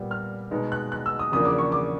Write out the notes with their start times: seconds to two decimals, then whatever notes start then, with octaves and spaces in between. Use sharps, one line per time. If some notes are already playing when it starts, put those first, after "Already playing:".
Already playing: A#2 G3 B3
0.11 F6
0.51 B2 G#3 B3 D#4
0.72 F#6
0.92 F#6
1.06 E6
1.19 D#6
1.32 E2 C#3 F3 A#3 D4 D#6
1.45 D6
1.58 C#6
1.72 D6